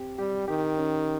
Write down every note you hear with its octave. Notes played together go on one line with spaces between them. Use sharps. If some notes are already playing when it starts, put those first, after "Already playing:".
Already playing: C4 G4
G3 G4
D#3 G4
C#4